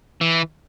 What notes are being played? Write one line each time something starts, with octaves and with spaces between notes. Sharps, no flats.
E3